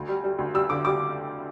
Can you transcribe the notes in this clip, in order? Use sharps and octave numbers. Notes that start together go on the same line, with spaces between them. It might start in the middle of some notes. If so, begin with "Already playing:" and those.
Already playing: D2
G3
G3
D2
G3 E6
D3 D6
G3 D6